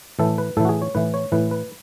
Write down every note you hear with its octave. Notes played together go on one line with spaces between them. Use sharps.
A2 E3 A4
B4
A2 E3 A4
F#4
G#4
C#5
A2 E3 B4
C#5
A2 E3 B4
B4